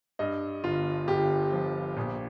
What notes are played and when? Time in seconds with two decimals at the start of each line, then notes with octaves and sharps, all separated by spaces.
0.19 G2 D#5
0.64 G1 F4
1.08 G1 G4
1.53 F3
1.97 A#1